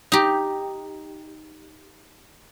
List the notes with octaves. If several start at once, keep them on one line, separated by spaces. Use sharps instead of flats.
D#4 G4